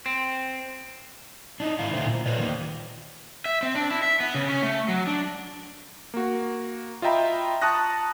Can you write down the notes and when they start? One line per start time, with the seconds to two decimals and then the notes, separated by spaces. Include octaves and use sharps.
0.06 C4
1.60 D4 D#4
1.79 G#2 D#3 E4 F5
1.93 A#2 D3 A3 C5
2.05 A#2
2.26 F4 B4 C5 D5
2.39 D#3 A#3
3.46 E5
3.63 C4
3.76 D4
3.90 E4
4.03 E5
4.20 B3
4.34 C#3
4.49 C#4
4.63 A3
4.88 F#3
5.07 D4
6.14 A#3 F#4
7.02 F4 D#5 E5 G5 A#5 B5
7.62 A5 A#5 C#6 D#6 F#6 A#6